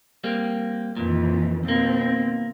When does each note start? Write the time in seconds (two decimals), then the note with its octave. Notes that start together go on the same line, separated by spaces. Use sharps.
0.24 G3 A#3 C4
0.97 F2 A#2 D#3 E3
1.65 D#2 B2 A#3 C4